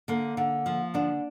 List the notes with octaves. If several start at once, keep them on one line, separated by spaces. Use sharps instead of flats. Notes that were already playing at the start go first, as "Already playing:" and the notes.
D3 A#3
D3
F3
D3 D4